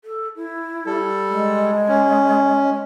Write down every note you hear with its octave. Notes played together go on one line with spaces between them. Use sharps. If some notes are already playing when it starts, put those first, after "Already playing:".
A4
E4
G3 A4
G#3
C#4